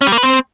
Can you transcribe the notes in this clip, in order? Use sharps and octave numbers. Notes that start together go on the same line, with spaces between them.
C#4
G3
A#3
B4
C4